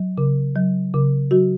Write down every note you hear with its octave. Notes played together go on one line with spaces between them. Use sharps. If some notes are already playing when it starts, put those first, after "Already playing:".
Already playing: F#3
C#3
F#3
C#3
F#3 F#4